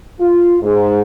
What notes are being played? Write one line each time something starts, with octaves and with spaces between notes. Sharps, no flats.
F4
G#2